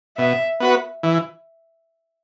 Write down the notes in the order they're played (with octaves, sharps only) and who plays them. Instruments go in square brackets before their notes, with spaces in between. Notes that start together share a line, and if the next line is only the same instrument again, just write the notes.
[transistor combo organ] B2 [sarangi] E5
[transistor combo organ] B3 F#4 B4
E3